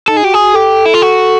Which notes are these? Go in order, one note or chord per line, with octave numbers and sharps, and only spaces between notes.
D#4 A4
G#4
F#4 G4
G#4
F#4
G4 A4
E4
F4
F#4